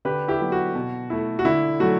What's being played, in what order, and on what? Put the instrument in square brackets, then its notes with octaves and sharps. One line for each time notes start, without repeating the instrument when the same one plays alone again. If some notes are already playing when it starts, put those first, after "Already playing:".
[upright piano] D3 G4 B4
E4 G4
F#3 B3 E4
F#4
B2
A3 E4
F#4
D3 E4
F#3 A3 F#4